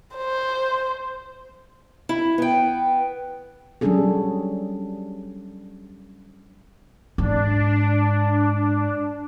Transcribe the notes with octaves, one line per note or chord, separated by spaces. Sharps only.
C5
E4
B3 G5
F#3 G3 C#4 D4 G#4 A4
G#2 D4